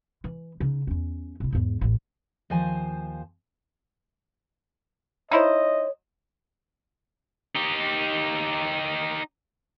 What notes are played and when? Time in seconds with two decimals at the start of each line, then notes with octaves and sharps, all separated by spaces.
0.24 E3
0.60 C#3 D#4
0.87 E2 C#4
1.40 C3 E4
1.52 E2 G#2
1.81 A1 D#2
2.50 D#2 F3 C5 G#5 A5
5.31 D#4 E4 C5 C#5 D#5
7.56 D#4 G4